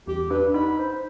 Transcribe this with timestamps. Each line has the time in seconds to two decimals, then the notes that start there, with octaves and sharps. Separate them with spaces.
0.07 E2 G4
0.31 D4 B4
0.54 D#4 B5
0.79 C5